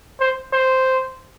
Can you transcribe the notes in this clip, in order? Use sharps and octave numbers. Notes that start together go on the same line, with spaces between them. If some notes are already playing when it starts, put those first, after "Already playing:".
C5
C5